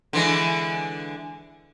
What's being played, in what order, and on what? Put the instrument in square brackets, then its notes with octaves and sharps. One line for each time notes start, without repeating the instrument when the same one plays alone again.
[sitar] D3 E3 G#3